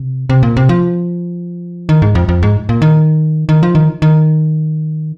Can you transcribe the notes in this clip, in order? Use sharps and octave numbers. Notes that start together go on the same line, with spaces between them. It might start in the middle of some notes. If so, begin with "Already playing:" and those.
Already playing: C3
C3
A#2
C3
F3
D#3
G#2
F2
F2
G#2
A#2
D#3
D#3
F3
D#3
D#3